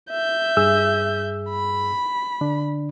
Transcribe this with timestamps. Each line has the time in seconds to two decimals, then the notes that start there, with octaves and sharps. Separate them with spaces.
0.11 E5 G6
0.57 G2 G#4 E6
1.50 B5
2.41 D3 D4